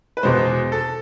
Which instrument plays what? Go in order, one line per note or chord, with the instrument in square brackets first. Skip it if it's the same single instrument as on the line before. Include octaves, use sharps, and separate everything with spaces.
[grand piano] B4
E2 B2 G#3 C5
A4